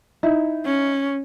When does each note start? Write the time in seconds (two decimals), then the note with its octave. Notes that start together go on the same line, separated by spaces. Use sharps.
0.23 D#4 E4
0.66 C#4